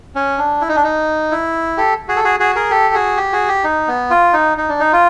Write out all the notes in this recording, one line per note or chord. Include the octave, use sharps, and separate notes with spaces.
C#4
D4
E4
D#4
D4
D#4
E4
G4 A4
F#4 G#4
A4
F#4 G#4
F#4 G#4
G#4 A#4
G4 A4
F#4 G#4
G4
F#4 G#4
G4
D#4
B3
F4
D#4
D#4
D4
D#4
F4